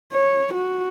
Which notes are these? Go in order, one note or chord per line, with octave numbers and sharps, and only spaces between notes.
C#5
F#4